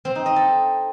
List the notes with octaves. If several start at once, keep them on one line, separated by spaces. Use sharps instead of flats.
C4
D#4
D#5
A4